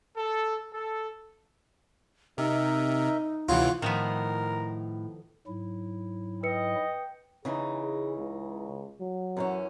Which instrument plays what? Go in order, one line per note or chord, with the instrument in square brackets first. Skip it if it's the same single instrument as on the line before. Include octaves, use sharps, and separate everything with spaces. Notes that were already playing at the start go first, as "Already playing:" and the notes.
[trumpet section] A4
A4
[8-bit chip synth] C3 [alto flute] D#4 [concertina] A#4 D#5 E5
[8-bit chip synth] D2 C3 E3 [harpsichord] F4 [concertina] C#5 F#5 C6
[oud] A2 [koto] D#3 F3 B3 [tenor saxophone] A#4
[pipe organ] G#2 F#3 E4
[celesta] B4 C#7 [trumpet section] D#5 [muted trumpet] G5
[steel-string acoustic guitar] C#3 E3 D#4 [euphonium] G#4
[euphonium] G#4
C#2
F#3
[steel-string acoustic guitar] F#2 E3 C#4